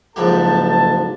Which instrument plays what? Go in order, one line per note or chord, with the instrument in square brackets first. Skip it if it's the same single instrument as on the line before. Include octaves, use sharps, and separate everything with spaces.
[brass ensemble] F#1 A4 A5 [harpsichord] F2 G#2 G4